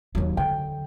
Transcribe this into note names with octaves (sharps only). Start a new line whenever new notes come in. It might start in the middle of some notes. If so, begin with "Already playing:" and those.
D#2 F#3
D3 G5